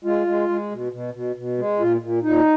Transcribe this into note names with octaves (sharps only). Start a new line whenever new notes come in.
G#3 F4
G#3
G#3
B2
B2
B2
B2
G#3
A#2 F4
A#2
A#2 D#4